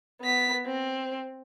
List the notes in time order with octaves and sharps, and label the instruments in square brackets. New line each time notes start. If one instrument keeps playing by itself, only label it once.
[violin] B3 B6
C4